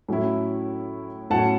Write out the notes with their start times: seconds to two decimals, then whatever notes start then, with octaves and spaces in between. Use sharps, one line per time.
0.08 A2 F#3 C#4 E4
1.30 A2 F#3 C#4 F#5 A5